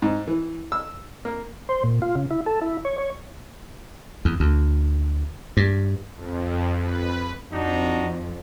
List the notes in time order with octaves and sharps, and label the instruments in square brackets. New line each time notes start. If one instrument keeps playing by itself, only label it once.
[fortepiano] G#2
E3
E6
A#3
[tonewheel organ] C5
A#2
F4
C#3
E4
A4
E4
C#5
C#5
[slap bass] E2
D2
G2
[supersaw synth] F2
B4
[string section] F2 [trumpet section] D4 D#4 F#4